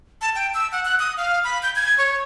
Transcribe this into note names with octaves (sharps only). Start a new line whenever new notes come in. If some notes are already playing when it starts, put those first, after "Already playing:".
A5
G5
E6
F#5
F#6
D#6
F5
B5
G6
G#6
C#5